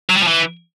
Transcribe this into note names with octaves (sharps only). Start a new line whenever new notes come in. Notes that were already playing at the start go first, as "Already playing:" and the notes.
F#3
G3
F3
E3